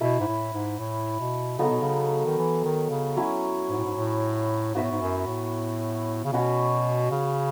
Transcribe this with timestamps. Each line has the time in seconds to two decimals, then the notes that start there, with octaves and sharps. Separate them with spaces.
0.01 B2 E4 B4 E5
0.20 G#2
0.28 A2
0.54 G#2
0.79 A2
1.20 B2
1.59 C#3 F#3 B3 D#4 A4
1.70 B2
1.81 C#3
2.26 D#3
2.38 E3
2.64 D#3
2.90 C#3
3.17 F#3 C#4 E4
3.70 G#2
3.77 A2
3.85 G#2
3.96 A2
4.75 G#2 B3 F#4 B4 E5
4.83 A2
4.91 G#2
5.01 F#2
5.27 A2
6.25 C#3
6.32 B2 C#4 F#4 B4
7.11 C#3